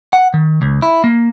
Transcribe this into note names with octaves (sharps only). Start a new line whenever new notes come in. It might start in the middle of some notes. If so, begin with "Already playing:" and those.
F#5
D#3
C#2
E4
A#3